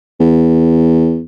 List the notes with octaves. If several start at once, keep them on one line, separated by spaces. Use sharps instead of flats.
E2